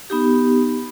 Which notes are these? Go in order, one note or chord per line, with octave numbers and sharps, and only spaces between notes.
B3 D#4 G4